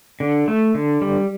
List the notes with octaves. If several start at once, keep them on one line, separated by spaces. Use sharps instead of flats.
D3
A3
D3
G3